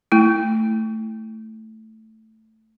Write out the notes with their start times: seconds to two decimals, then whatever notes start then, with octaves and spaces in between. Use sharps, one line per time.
0.12 A3 E4